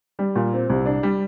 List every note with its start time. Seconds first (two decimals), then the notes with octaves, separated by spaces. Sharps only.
0.19 G3
0.36 A#2
0.53 C4
0.70 C2
0.86 D4
1.03 G3